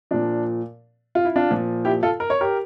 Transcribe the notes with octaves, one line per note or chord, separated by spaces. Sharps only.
A#2 F3 D4
F4
E4
D4 F4
A#2 F3
E4 G4
F4 A4
A#4
C#5
G4 A#4